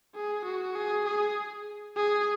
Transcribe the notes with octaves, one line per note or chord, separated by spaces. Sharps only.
G#4
F#4
G#4
G#4
G#4